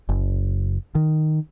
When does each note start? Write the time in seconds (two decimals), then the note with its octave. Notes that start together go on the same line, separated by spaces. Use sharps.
0.09 F#1
0.95 D#3